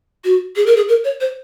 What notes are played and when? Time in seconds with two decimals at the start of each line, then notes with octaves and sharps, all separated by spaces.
0.24 F#4
0.56 G#4
0.66 A#4
0.76 G#4
0.88 A#4
1.04 C#5
1.20 C5